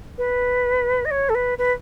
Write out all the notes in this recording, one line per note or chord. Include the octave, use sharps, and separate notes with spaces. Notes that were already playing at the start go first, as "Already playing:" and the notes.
B4
D#5
C#5
A4
B4
B4